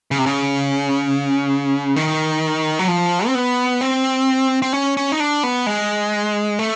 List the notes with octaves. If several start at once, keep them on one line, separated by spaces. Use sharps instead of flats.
C#3
C3
C#3
D#3
F#3
F3
C4
B3
C4
C4
C#4
C#4
D#4
D4
B3
G#3
A3